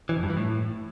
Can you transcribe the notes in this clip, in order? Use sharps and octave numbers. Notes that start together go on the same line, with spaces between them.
E3
F2
G2
E3
A2